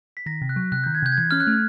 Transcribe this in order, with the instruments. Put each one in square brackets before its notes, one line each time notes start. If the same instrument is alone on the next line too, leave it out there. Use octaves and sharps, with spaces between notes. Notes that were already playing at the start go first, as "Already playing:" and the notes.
[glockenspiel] B6
[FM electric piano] D#3 [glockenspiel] A#6
[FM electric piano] C3
[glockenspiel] F#6
[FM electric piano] F#3
[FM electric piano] C3 [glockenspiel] F#6
[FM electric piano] D#3 [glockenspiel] G6
[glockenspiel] G#6
[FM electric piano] C3 [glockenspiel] G6
[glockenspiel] G#6
[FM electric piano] E3 [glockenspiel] G6
[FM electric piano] C#4 [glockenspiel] F6
[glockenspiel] F#6
[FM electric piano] A3